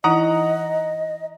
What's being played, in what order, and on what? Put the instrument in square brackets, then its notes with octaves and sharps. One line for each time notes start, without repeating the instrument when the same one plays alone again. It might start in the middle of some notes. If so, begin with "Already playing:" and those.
[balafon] E3 D#4 E4 [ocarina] D#5 [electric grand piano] F#5 A#5 D#6